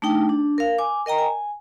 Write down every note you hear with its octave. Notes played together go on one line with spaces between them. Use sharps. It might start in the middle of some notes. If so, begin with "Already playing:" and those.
A3 D4 D#4 G5
D4
A#4 F5
G#5 D6
A#4 D#5 G5 A#5
G#5